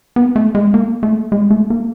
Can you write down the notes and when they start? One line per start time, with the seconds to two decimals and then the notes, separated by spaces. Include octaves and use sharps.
0.16 B3
0.36 A3
0.55 G#3
0.74 A#3
1.03 A3
1.32 G#3
1.50 A3
1.70 A#3